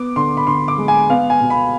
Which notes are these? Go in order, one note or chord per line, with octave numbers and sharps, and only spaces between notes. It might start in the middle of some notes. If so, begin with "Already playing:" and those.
Already playing: B3 D6
D3 C6
B5
D3 C6
D6
G#3
G#5
B3 F5
G#5
B2
B5